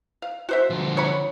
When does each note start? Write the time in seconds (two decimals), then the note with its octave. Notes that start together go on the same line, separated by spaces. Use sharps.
0.22 F5
0.49 F#4 C5 E5
0.70 D3 F3
0.97 C#5 F#5 B5